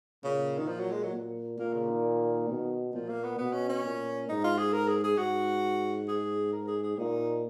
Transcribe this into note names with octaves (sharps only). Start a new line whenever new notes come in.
A#2 C#3
D#3
F3
F#3
G#3
F#3
A#2
A#2 A#3
C#3
D#3
B2
A#2 F3
A#3
B3
B2 B3
C#4
C#4
A#2
G#2 D#4
F4
G#4
A#4
G#4
G#4
G#2 F#4
G#4
A#4
G#4
G#4
A#2 D#4